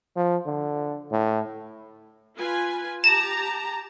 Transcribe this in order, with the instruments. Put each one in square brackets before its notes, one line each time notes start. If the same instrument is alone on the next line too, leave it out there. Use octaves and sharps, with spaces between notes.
[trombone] F3
D3
A2
[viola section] F4 B4 G#5
[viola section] G4 A5 A#5 [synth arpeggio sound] E7